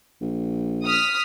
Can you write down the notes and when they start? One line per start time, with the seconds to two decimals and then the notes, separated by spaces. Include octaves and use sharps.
0.21 A#1
0.84 D#6 F6 B6